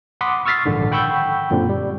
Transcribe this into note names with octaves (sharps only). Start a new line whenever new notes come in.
F#5 B5 C6 D6 D#6 B6
C#6 E6 F6 A6 B6 C7
A#1 G#2 D3 D#3
F#5 G5 B5 C#6 E6 G6
F#2 A#2 D3 C4
G3